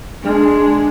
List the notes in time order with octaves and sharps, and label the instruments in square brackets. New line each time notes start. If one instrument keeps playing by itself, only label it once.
[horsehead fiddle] G#3 D4